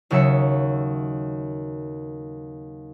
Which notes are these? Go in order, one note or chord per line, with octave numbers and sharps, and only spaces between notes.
D#2 C#3 F#3 D#4 E5 C#7